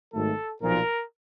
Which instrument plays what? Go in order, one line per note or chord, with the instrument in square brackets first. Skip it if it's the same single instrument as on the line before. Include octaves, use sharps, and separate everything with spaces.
[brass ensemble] G#1 G#2 D#3 F#3 A3 [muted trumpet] A4
[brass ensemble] B1 A#2 F3 [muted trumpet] A#4